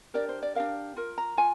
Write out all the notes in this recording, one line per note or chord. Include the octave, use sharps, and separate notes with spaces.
D4 G4 A#4 D5
C5
D5
D4 G4 A#4 F5
F4 A#4
A#5
F4 G#5